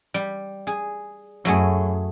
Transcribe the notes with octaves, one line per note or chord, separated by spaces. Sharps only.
G3
G#4
F#2 F#3 A3 G#4